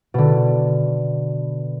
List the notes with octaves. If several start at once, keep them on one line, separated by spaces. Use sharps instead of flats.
B2 D3